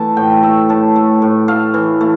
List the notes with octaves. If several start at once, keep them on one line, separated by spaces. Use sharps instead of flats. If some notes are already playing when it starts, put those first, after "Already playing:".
Already playing: E3 A3 A5
A2 G5
A3 E5
A2 A5
A3
A2
A3 F5
E3
A3